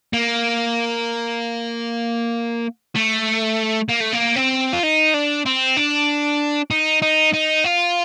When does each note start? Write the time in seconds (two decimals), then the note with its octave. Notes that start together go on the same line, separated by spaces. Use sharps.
0.13 A#3
2.95 A3
3.89 A#3
4.01 A3
4.13 A#3
4.36 C4
4.73 F4
4.83 D#4
5.14 D4
5.46 C4
5.77 D4
6.71 D#4
7.02 D#4
7.34 D#4
7.64 F4